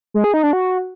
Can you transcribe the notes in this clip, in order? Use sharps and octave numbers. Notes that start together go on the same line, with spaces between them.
G#3
G#4
D#4
D4
F#4